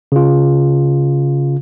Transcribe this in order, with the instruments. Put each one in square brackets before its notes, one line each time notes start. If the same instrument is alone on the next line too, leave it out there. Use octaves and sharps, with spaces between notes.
[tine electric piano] C#3 F4